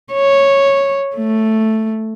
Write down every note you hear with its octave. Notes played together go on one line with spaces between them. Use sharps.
C#5
A3